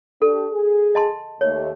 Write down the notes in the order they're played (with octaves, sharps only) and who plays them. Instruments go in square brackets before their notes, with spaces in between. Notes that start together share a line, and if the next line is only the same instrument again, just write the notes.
[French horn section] D4 G4 [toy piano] A4
[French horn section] G#4
[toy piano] D#5 A5 C6
[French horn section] D#2 A3 [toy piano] C#5